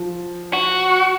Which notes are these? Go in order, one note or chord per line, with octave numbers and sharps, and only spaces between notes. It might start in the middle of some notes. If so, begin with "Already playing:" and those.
Already playing: F3
F#4